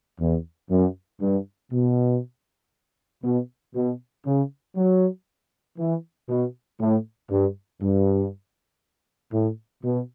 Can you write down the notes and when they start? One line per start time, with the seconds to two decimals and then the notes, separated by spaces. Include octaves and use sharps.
0.20 E2
0.70 F#2
1.21 G2
1.72 B2
3.24 B2
3.75 B2
4.26 C#3
4.76 F#3
5.78 E3
6.29 B2
6.80 A2
7.30 G2
7.81 G2
9.33 A2
9.84 B2